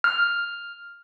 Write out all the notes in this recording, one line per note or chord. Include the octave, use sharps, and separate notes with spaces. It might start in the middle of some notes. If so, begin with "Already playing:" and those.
F6